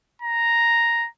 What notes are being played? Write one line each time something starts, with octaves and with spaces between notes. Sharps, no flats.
A#5